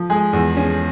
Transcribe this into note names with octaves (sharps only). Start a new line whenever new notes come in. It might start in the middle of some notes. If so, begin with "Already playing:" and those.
Already playing: F3
G#3 G#4
E2
C#4